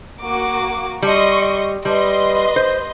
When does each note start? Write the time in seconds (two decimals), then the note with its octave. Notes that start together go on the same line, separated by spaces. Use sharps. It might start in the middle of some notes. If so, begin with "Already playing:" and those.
0.21 A#3 F#4 D6
1.02 G3 D#5 C6 C#6
1.85 G3 B4 D#5 C6
2.56 C5